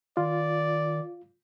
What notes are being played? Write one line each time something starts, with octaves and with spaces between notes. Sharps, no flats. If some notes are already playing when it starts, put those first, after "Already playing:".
D#3 F4 D5